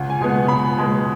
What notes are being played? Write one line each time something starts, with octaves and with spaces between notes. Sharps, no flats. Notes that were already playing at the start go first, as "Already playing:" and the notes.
Already playing: C#2 F#5
G#5
B2 G#3 B3
F#5
C#2 B5
B2 G#3 B3